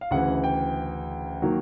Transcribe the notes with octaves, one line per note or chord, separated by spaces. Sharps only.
F5
D2 C#3 E3 F#5
G5
D#3 F#3 A#3